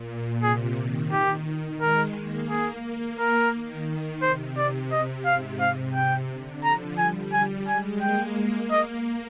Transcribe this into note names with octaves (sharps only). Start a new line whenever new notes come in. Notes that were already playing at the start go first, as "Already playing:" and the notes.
Already playing: A#2
C3 G#4
D#3
D#3 G4
G#3 A#4
A#3
G#4
A#4
D#3
C3 C5
D5
D#5
G#2 F5
C3 F5
G5
D3
F3 A#5
G3 G#5
G#5
G#3 G#5
A#3 G5
A#3
A#3 D#5